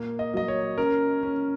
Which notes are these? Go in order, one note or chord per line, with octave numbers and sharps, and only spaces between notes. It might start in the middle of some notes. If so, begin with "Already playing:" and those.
Already playing: A#2 A#3
D#5
F#3 D#5
C#5
C#4 A#4
C#4